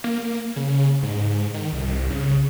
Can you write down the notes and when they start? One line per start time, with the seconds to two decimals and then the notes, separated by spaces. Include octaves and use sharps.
0.04 A#3
0.56 C#3
1.03 G#2
1.54 D#3
1.73 C2
2.10 C#3